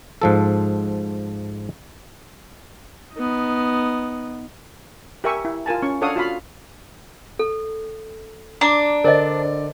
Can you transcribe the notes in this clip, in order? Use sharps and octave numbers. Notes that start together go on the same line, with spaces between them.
G#2 F3 A4
B3 D#4
G4 A#4 E5 G#5 C#6
E4
F4 A#4 G#5 A5
C#4 C#6
D4 A4 C#5 F5 F#5 D#6
F4 F#4 F5 B5
A4
D4 A#5 D6
D3 A#4 C5 D5 D#5